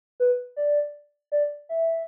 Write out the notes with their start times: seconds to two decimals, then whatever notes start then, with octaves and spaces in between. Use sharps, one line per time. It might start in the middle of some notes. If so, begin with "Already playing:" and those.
0.20 B4
0.56 D5
1.32 D5
1.69 E5